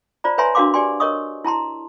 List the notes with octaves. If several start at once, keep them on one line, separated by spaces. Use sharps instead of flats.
F4 C5 D5 A#5
B4 C#5 E5 G#5 A#5 C6
D4 F#4 A#4 F5 C6 D6
G4 D5 G#5 C6
A#4 C#5 D#5 C#6 D#6
E4 A5 A#5 C6